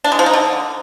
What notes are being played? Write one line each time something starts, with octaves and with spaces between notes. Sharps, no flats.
D4
G#3
F3
D#4
D3